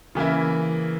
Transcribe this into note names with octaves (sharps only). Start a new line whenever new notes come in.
C#3 E3 A#3 E4